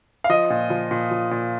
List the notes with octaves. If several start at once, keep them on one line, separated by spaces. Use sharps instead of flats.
F5
F3 D#5
A#2
F3
A#2
F3
A#2